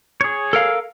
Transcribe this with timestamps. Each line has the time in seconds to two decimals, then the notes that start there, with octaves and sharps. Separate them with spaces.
0.21 G#4 C#5
0.53 A4 A#4 F5